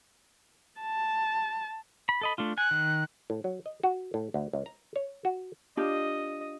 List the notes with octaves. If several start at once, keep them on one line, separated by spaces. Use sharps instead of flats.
A5
B5
A4 D#5 B5
A3 D4 F4
G#5 F#6
D#3
A2
F#3
D#5
F#4
A2
D2
C#2
A#5
C#5
F#4
D4 F4 G4 D#5